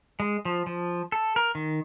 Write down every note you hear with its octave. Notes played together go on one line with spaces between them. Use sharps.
G#3
F3
F3
A4
A#4
D#3